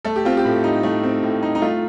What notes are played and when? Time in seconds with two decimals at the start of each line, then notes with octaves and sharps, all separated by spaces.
0.05 A3 A4
0.16 G4
0.25 C4 F4
0.37 G4
0.45 A2
0.64 D#4
0.83 A3
1.03 C4
1.23 A2
1.43 D#4
1.55 D#4
1.62 A3 F4